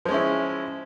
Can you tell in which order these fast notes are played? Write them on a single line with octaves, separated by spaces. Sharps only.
F3 G#3 C#4 E4